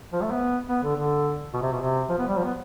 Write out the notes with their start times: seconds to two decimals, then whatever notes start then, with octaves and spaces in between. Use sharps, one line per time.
0.13 F3
0.22 A3
0.31 B3
0.69 B3
0.83 D3
0.96 D3
1.53 B2
1.62 C3
1.72 B2
1.81 C3
2.09 F3
2.18 B3
2.28 G3
2.38 F3
2.45 B3